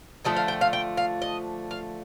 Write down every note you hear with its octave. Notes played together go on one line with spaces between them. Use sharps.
D3 F3 A3 D#5
F5
G5
F5
G5
F5
D#5
F5